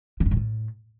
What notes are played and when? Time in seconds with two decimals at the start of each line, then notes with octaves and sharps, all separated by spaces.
0.20 D3
0.26 G2
0.31 G#2
0.37 A2